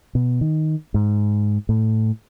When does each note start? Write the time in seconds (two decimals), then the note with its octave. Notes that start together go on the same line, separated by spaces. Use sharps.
0.15 B2
0.41 D#3
0.94 G#2
1.69 A2